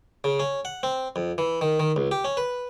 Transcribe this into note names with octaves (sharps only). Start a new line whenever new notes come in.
C#3
C#4
F#5
C4
F2
E3
D#3
D#3
C#2
G4
C#4
B4